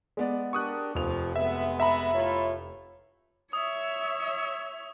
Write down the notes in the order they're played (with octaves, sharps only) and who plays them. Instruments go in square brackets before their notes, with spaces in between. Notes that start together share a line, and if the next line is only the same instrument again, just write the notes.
[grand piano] G#3 B3 D5
[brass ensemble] D4 G4 A#4 [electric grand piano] C#6 D#6 F#6
[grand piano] F1 F7 [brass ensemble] F3
[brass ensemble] G#3 B3 [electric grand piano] E5
[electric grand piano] E5 A#5 B5
[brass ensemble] A2 F4 C#5
[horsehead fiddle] C#5 [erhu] E5 [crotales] D#6